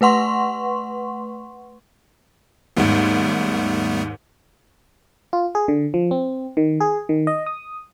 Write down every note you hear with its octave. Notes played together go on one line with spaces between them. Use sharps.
A3 B4 F#5 C6 C#6
D#2 G#2 G3 A3 B3
F4
G#4
D3
F3
C4
D#3
G#4
D#3
D#5
D#6